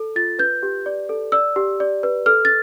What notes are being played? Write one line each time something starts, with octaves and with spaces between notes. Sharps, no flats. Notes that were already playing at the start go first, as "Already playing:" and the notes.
Already playing: A4
F4 A6
B4 G6
G4
D5
A4
D5 E6
G4
D5
B4
A4 F6
A6